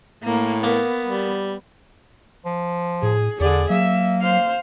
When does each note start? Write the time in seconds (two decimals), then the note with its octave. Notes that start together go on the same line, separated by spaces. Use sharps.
0.23 A2 A#3
0.64 A#3 B3
1.04 G3
2.45 F3
3.03 A2 G#4
3.40 E2 D3 G#4 D5
3.70 F#3 A#3 E5
4.21 C5 F5